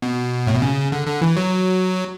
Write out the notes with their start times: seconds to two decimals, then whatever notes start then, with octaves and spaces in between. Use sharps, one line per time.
0.02 B2
0.47 A2
0.54 B2
0.62 C#3
0.92 D3
1.07 D3
1.21 E3
1.37 F#3